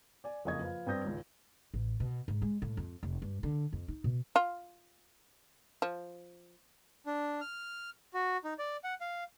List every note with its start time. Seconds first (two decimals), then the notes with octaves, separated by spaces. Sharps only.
0.24 D5 G#5
0.45 F#1 F2 C#3 D#5 C#6 G#6
0.60 F3 B4 F5
0.86 G2 C4 D5 D#6 G6 A#6
1.04 G#1 C#2
1.74 A1
2.00 B2
2.28 G#2
2.42 G#3
2.62 A2
2.77 F2
3.03 F1
3.22 G2
3.43 D3
3.73 F2
3.88 D#4
4.04 B2
4.36 F4
5.82 F3
7.06 D4
7.41 F6
8.14 F#4
8.44 D#4
8.59 D5
8.84 F#5
9.01 F5